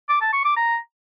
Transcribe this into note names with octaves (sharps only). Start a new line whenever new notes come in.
D6
A5
C#6
D6
A#5